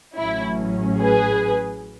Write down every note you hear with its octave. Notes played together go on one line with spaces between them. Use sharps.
A1 A2 F#3 C#4 E4
G#4 B4